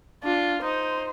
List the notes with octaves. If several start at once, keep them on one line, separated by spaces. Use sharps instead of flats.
D4 F4
D#4 C5